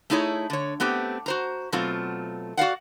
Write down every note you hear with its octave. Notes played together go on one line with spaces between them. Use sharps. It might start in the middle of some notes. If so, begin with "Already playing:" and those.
A3 D#4 E4 G#4 C#5
D3 C#5
A3 B3 C4 G4
F#4 C5 A#5
B2 F#3 A3 C4 F4
F#4 D5 F5 F#5